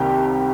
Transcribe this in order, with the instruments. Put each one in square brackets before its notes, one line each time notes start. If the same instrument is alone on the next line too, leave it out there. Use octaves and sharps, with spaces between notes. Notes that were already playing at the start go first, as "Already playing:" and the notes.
Already playing: [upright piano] C2 C3 D#3 G3 A#3 G4 G5